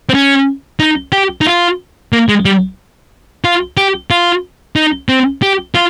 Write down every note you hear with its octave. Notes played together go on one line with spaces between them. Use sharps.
C4
C#4
D#4
G4
D#4
F4
A#3
G#3
G3
F4
G4
F4
D#4
C4
G4
F4